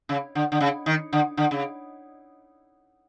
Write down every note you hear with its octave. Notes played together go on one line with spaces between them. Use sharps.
C#3
D3
D3
C#3
D#3
D3
D3
C#3